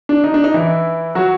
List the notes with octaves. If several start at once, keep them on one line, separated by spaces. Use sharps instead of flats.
D4
D#4
D4
D#4
E3 E4
F#3 F#4